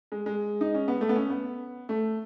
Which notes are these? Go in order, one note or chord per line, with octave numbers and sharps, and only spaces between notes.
G#3
G#3
D#4
C#4
B3
A3
B3
C#4
B3
A3